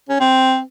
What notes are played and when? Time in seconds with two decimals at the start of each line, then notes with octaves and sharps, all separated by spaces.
0.09 C#4
0.20 C4